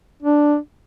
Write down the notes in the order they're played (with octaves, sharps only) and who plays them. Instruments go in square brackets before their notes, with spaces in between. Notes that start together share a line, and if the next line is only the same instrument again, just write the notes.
[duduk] D4